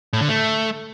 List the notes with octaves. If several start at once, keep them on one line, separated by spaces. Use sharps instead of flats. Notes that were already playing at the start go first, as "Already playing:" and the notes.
A2
D3
A3